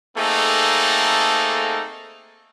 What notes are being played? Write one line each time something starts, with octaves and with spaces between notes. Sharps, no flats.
A3 A#3 C4 D#4 G#4 A4